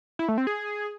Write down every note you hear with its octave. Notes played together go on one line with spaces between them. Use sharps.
E4
A3
C4
G#4